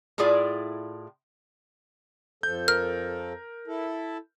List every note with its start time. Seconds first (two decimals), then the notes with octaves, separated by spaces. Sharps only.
0.18 A2 E4 F4 G#4 D5
2.43 F2 F3 A4 G6
2.68 A#4 F6
3.67 E4 A4